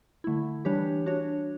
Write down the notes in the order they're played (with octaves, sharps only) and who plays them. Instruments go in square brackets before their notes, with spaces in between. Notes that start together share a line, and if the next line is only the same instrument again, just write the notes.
[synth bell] D3 A3 E4
E3 G3 D4 G4 C#5
D4 F#4 C#5